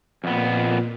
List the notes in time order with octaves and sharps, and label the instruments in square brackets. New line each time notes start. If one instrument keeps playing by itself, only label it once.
[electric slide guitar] F2 B3 [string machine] A#2